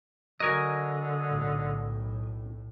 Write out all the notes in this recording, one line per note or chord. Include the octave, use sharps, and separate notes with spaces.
D3 F#3 A#4 D#5 G#5
B1 A2